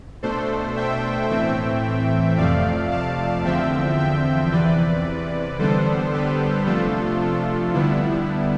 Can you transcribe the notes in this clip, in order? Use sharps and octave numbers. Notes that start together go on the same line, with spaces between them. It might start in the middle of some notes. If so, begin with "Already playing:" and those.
B2 A3 D4 A4 C5
E5 G5
A2 E3 A3 C4 E5 G5
F2 C3 F3 A3 D5 F5
F5 A5
E2 D3 F3 C4 E5 G5
E5 G5
E2 C3 E3 B4 D5
D3 G3 B3 D4 A4 C5
G4 B4
C3 F3 A3 D4 F4 A4
F4
D3 G3 B3 D4 E4